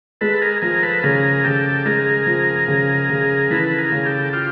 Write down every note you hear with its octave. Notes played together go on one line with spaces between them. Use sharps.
G#3 A4 B4
G#4 A#4
F3 G#4 A#4
A4 B4
C#3 G#4 A#4
C#3 G4 A4
G#3 G#4 A#4
F3
C#3
C#3
E3 A4 B4
G#4 A#4
C#3
G4 A4
F4 G4